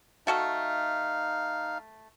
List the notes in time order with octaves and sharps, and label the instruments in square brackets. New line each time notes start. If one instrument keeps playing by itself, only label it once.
[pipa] A3 F#4 A4 [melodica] D#4 F5